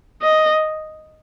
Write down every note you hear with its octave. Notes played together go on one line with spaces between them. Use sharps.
D#5